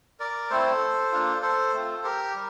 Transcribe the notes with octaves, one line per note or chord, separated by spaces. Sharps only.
A#4 D5
A3 C4 E4 A4 C5
A#3 D4 F4
A4 C5
A3 C4 F4
G4 A#4
G3